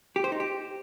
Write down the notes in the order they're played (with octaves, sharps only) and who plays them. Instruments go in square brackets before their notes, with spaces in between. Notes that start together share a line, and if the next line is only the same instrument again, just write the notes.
[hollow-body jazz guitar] G4
C5
D#4
G4